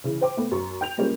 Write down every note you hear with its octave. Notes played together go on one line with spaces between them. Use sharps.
C#3 E3
C5 G5 D6
A3 B3
F#2 C#6
G5 G6 F7
G3 G#3 A#3 C#4 F4